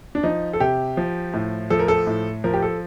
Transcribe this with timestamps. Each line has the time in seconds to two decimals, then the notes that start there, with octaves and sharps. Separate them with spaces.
0.15 D4
0.23 F3 D#4
0.53 A4
0.60 C3 G4
0.97 F3
1.34 A2
1.70 F3 A4
1.79 A#4
1.88 A4
2.07 A2
2.44 F3 A#4
2.54 G4
2.62 A4